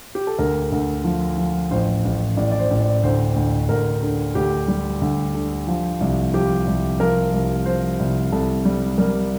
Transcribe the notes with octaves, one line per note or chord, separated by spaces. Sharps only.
G4
A4
D2 A#4
D2
F3
F3
A1 C5
A1
A1 D5
D5
C5
A1
D5
D2 C5
D2
D2 A#4
D3
D2 G4
G3
D2
D3
F3
C2
F3 G4
C2
F3 A#4
C2
F3 C5
C2
C2 A4
G3
G3 A#4